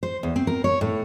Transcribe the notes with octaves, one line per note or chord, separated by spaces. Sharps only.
C5
E2
C4
A#4
C#5
A2